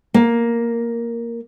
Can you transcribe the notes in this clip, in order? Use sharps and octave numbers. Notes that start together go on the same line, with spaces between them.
A#3